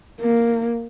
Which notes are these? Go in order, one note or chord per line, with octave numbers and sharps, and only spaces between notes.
A#3